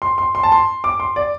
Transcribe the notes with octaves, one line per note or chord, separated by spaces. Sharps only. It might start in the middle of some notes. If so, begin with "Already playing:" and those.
C6
C6
C6
A5
C6
D6
C6
D5